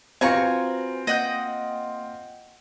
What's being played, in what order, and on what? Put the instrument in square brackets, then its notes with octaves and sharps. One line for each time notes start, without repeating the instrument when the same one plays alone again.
[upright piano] C4 F4 [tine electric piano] F#4 B4 C5 [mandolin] G#5 A#5 C#6
[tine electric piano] A#3 [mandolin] D#5 F#5 G5